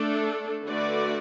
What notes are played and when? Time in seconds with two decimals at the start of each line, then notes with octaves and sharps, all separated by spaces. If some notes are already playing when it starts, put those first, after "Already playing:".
Already playing: A3 D4 A4
0.66 D3 A3 F#4 B4 D5